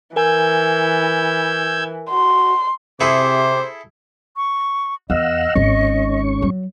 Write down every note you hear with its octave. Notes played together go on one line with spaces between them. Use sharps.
E3 A#4 G#5 E6 G6 G#6
F#4 C6
C3 E4 G#4 A4 C5 D6
C#6
E2 D#5 F5 F#5 E6
G#1 G#2 D#3 C#4 C#6
F#3